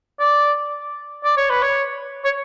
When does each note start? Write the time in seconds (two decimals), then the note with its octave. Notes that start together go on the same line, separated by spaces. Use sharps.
0.20 D5
1.24 D5
1.37 C#5
1.50 B4
1.62 C#5
2.24 C#5